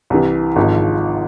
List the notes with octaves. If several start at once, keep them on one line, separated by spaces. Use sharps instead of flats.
C2 C3 E3
G#1 G#2 F3 G#3